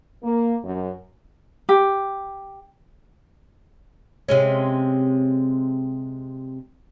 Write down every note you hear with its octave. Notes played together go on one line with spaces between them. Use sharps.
A#3
F#2
G4
C3 G#3 C#4